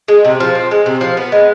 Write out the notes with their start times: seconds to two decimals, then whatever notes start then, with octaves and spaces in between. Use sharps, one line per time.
0.08 G#3
0.25 C3
0.40 F3
0.55 C4
0.71 G#3
0.86 C3
1.01 F3
1.17 B3
1.32 G#3